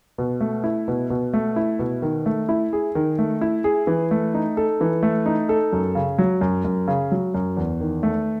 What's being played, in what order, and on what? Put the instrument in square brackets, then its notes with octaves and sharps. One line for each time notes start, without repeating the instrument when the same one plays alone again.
[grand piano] B2
A3
E4
B2
B2
A3
E4
B2
D#3
A3
E4
G#4
D#3
A3
E4
G#4
E3
A3
D#4
A4
E3
A3
D#4
A4
F#2
C#3
F#3
F#2
F#2
C#3
F#3
F#2
E2
D#3
A3